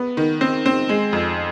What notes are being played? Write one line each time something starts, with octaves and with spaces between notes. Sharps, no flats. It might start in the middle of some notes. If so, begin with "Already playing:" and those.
Already playing: B3
D#3
C4
C4
G#3
F2